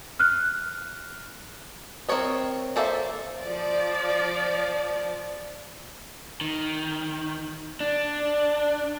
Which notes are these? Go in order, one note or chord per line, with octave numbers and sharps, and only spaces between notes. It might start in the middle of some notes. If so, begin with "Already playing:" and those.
F6 F#6
C4 C#4 A#4 C#5 D#5
A#3 A4 C5 C#5 E5
F3 D5
D#3
D4